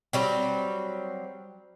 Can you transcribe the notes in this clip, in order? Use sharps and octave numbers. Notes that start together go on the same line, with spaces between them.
F#3 G3 C4